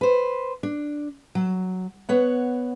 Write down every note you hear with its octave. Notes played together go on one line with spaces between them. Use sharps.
B4 C5
D4
F#3
B3 C#5 F#5